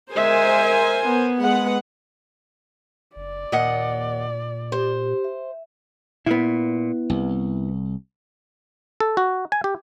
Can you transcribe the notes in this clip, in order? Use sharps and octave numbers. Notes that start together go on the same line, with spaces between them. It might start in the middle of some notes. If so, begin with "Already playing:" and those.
G#3 A#4 C5 E5 G#5
B3
G#3 B4 F#5
F#1 D5
D#2 A#2 D#5 F#5
G4 C5
E5
A#2 B3 E4
C2
A4
F#4
G#5
G4